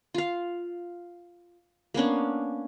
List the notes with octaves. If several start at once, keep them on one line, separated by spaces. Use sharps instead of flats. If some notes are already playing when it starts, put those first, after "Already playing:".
F4 F5
A#3 B3 C#4 D4